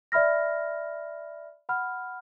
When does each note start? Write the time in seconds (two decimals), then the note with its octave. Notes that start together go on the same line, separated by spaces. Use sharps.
0.12 D5 E5 B5 F6 A#6
1.69 F#5 B5 F6